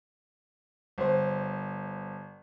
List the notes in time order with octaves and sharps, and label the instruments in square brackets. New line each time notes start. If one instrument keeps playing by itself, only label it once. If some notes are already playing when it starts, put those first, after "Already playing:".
[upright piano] G1 C5